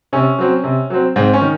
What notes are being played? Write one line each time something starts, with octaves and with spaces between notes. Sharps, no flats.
C3 C#4
F#3 C4
C3
F#3 C4
G#2 C4
C#4
D#3